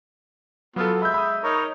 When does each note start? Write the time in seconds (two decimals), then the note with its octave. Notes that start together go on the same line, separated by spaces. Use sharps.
0.76 F#3 B3 F4 A4
1.02 G#3 E5 B5 G6
1.14 B5 D#6
1.44 D#4 A#4 C#5